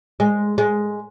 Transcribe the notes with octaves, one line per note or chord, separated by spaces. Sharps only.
G#3
G#3